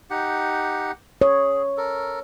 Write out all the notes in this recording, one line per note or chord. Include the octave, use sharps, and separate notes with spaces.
D#4 G4 F#5
G#4 C#5
A4 A#4